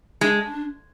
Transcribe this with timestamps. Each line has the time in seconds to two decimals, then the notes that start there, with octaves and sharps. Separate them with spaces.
0.21 G#3 D4